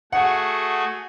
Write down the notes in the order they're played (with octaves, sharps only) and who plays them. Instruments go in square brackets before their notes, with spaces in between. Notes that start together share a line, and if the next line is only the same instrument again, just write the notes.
[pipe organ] A3 F#4 G#4 [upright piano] F#5